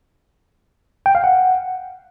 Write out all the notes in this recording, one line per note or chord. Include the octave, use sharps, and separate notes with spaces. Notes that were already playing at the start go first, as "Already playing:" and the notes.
G5
F5
F#5